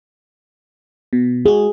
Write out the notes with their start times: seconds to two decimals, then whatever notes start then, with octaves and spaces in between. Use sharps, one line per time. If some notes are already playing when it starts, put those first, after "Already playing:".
1.13 B2
1.46 G#3 F#4 G#4